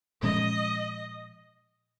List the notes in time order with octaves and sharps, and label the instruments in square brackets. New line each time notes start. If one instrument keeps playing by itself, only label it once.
[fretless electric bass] A#2 F3 G#3 C#4 [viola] D#5